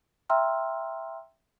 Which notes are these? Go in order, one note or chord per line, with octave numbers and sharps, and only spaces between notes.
E5 G5 A#5 C6 E6 F6